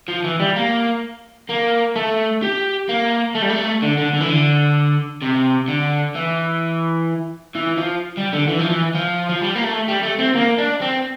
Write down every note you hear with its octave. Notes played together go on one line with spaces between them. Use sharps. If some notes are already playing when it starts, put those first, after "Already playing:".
F3
E3
G3
A#3
A#3
A3
G4
A#3
A3
G3
A3
D3
D3
D3
E3
D3
C3
D3
E3
E3
F3
G3
D3
E3
F3
E3
F3
F3
G3
A#3
A3
G3
A3
C4
A#3
D4
C4